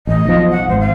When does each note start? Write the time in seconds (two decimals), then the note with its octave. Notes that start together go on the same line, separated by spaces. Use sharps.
0.07 A1 D#5
0.25 B1 F3
0.51 F#5
0.69 G#1 C5
0.80 F5